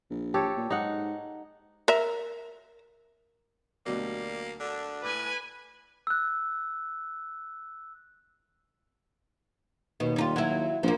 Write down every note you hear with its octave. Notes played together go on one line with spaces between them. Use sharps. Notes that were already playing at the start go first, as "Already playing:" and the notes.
A#1
G4 A4 C#5
A#2
G#2 D#4 F#5
A#4 E5
D2 B2 F#3 G3 A#3
D3 D4
A2 B4 G#5 D6
E6 F#6
D#2 B2
G3 D#4 F4
F#3 E4
A#1 F3 A#3